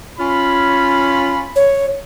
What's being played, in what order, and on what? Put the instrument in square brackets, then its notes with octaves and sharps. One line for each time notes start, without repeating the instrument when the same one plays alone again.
[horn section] C#4 F4 B5
[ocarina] C#5